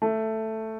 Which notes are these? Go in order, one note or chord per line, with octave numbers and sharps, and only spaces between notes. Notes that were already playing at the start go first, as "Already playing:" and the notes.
A3